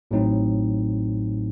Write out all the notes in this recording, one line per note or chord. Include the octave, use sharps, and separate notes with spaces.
A1 A2 F#3 C4 D#4